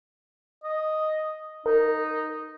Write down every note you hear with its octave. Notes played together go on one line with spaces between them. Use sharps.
D#5
D#4 A#4